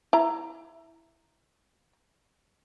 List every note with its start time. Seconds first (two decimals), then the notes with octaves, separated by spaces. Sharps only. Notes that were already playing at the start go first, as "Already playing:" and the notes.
0.13 E4 A#5